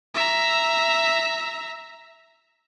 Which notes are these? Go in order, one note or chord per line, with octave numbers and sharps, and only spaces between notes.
E5 A#5